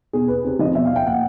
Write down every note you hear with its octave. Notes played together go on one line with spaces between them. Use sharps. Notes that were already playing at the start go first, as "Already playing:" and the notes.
B2 G#4
B4
C3 C5
F3 D#5
B2 E5
F5
G5
A#2 F#5